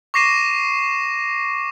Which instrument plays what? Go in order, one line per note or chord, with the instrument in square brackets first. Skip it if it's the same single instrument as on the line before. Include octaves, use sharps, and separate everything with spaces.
[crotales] C#6 D6 A#6 C7 D#7 E7